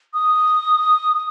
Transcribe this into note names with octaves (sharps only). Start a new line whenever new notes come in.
D#6